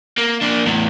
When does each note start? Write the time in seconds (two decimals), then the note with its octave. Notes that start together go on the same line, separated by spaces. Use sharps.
0.18 A#3
0.41 A#3 D4
0.66 E2 A2